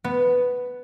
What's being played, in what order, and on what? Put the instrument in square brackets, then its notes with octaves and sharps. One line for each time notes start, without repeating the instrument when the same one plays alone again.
[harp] B3